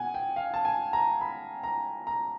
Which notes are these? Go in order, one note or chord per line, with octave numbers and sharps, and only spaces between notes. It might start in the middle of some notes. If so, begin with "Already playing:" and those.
Already playing: B2 F#5 G#5
G5
F5
A5
G#5
A#5
B5
A#5
A#5